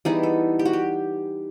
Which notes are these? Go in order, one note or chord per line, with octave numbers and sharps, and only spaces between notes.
E3 G3 B3 D#4 G#4
A4
G4
F#4
G4